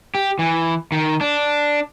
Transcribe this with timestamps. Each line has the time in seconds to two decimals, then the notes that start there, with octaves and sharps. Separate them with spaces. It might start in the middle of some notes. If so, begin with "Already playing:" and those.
0.15 G4
0.39 E3
0.92 D#3
1.21 D4